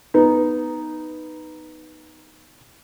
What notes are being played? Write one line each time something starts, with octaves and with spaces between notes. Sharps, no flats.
B3 D#4